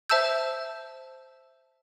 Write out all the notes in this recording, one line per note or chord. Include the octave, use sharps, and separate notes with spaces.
C5 E5 A5 E6 G6